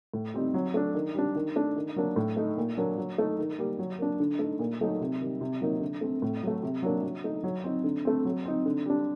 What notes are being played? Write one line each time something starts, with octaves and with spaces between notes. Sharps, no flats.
A2
G3 C4 D#4
F#3
A3 D4
D#3
G3 D4
D#3
A3 D4
D#3
F#3 A#3 D4
A2
A3 D#4
A#2
F#3 A#3 D4
F#3
A3 D#4
D#3
G3 A#3
F#3
A#3 D4
D3
A3
D#4
A#2
F#3 A3 D#4
C3
D#3 G3
C3
D#3 F#3 A#3 D#4
D3
A3 C4
A2
F#3 A3
C3
F#3 A#3 D4
F#3
A3 D#4
F#3
C4 D#4
D3
A3 C4
F#3
C4 D#4
D3
G3 D4